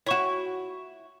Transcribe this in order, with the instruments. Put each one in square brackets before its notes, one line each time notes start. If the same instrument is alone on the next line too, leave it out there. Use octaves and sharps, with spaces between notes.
[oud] E4 F#4 [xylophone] C#5 C#6 E7